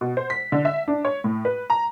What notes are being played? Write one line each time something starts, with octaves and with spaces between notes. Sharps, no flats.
B2
C5
B6
D3
E5
D4
C#5
A2
B4
A#5